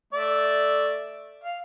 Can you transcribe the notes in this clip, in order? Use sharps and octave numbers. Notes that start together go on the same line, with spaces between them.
A3 D5 E5
F5